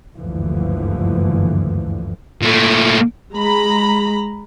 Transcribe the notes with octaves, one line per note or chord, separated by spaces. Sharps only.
F#1 D2 G2 D3 E3 F3
A#2 A3
G#3 A#5 B5